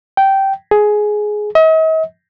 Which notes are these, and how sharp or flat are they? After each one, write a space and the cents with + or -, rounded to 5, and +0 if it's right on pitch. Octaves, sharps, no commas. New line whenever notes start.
G5 -10
G#4 +15
D#5 +45